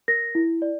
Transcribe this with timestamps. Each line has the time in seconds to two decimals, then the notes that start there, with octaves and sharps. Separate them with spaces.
0.08 A#4 A#6
0.35 E4
0.62 D5